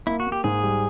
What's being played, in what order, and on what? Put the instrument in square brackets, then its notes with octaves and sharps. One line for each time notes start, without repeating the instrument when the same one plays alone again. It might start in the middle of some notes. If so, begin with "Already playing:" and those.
[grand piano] A#3 [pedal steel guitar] E4
[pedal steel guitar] F#4
[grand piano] A#3
[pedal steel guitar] G4
[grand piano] G#2 [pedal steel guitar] G#4
[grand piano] G3